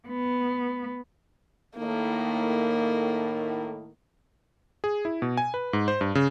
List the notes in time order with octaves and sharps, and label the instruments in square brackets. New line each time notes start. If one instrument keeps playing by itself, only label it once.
[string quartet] B3
[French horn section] A2 D#3 [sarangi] A#3
[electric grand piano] G#4
E4
B2
G#5
B4
G#2
C5
G2
C#3